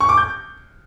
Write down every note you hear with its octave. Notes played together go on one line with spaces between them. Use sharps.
C#6
D6
G6